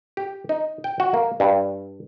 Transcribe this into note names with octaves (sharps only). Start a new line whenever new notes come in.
G4
D#4
G5
F#4
A#3
G2